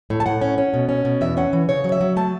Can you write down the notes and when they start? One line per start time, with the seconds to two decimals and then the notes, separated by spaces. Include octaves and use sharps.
0.10 A2
0.20 A5
0.26 A2 F#5
0.41 C#4
0.58 C#4
0.74 B2
0.89 C#4
1.05 B2
1.21 E2 E5
1.37 C#4 F#5
1.53 E3
1.69 C#3 C#5
1.84 F#3
1.92 E5
2.01 F#3
2.16 A3 A5